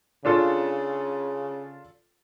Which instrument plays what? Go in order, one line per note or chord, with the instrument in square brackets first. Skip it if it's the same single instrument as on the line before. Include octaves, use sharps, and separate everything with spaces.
[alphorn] C#3 [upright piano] D4 F4 A4